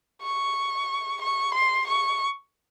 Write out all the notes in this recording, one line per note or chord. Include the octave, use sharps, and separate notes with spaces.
C#6
C#6
C6
C#6